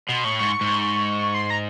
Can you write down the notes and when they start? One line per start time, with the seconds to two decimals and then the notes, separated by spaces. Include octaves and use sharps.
0.08 B2 C6
0.24 A2 C#6
0.39 G#2 C#6
0.61 G#2
1.34 C6
1.50 A#5